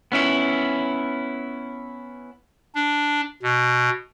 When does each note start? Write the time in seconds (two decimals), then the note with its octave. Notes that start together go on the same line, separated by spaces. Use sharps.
0.12 B3 C#4 E4
2.75 D4
3.43 B2